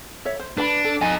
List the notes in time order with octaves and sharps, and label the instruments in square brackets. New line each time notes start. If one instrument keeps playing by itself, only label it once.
[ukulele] C#5 E5
C5
[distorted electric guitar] D4 [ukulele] B4 B5
[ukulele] A4
[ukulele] D#4 G#5 [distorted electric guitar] A4 D#5